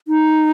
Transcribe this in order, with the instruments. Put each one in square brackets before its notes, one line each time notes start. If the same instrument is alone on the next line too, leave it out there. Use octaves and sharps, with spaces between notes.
[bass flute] D#4